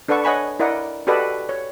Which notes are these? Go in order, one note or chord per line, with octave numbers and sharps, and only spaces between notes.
D4 A4 B4 D5 F#5 C#6
C#5 D#5 F#5 G#5 B5 C#6
E4 A#4 D5 D#5 F#5
F#4 G4 A4 B4 D5 D#5
C#5